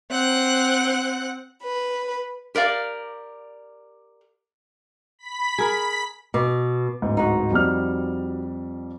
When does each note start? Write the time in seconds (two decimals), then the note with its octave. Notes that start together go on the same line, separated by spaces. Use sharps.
0.10 C4 F#5 F#6
1.63 B4
2.55 G4 A#4 D5 F5
5.19 B5 B6
5.58 G#4 A#4
6.34 B2 D6
7.02 D1 G#2
7.17 D#4 F#4
7.51 F2 G3 F6